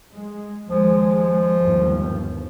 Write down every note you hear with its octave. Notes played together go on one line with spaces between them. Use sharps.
G#3
D#2 F3 G#3
G1 D#2